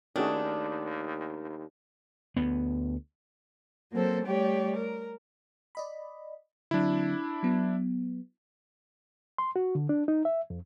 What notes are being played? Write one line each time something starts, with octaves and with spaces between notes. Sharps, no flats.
D#2 D#3 A3 C#4 D4 F#4 G#4
D2 B3
F#3 A#3 C4 A4 C5
G3 A3 G4 C#5 D5
A#4
D5 D#5 B5
D3 F#3 C4 D4 E4
F#3 B3
C6
F#4
D3
D4
D#4
E5
F2